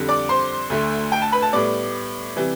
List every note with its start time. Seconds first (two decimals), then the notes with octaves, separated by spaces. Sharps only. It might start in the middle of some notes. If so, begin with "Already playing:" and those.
Already playing: F2 D3 G3
0.08 D5 D6
0.29 C5 C6
0.70 D2 D3 A3
1.12 G5
1.22 A5
1.32 B4 B5
1.42 A5
1.53 A2 G3 B3 D5 D6
2.36 C3 E3 G3